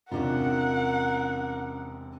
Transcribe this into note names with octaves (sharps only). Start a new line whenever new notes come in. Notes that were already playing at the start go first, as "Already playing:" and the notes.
E1 C3 C#4 D4 F4 A#4 F#5